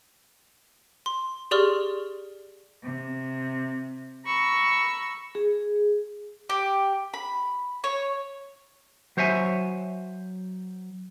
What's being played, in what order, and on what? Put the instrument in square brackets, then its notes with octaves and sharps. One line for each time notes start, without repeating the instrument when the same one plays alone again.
[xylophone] C6
G4 G#4 D5 C6 C#6 F6
[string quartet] C3
A#5 B5 C#6 E6
[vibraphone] G#4
[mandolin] G4
B5
C#5
[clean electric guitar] F#3 C5 C#5 E5 G#5